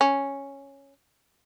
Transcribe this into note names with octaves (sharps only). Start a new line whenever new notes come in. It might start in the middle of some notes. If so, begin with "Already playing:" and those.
C#4